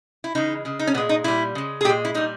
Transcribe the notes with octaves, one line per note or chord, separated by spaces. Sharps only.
E4
C#3 E3 G#3 D#4
C#3 G#3
D#4
C#4
A#2 G#3 B3
D#4
A#2 G3 E4
C#3 G#3
G#4
A#2 G#3 G4
E4
A#2 G3 D#4